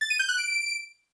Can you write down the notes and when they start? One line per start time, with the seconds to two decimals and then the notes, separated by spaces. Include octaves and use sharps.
0.01 A6
0.10 D#7
0.19 G6
0.29 F#6
0.38 D7